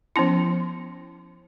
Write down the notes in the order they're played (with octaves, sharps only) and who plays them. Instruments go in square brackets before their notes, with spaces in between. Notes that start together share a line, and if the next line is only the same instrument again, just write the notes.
[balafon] F3 B3 C#4 E4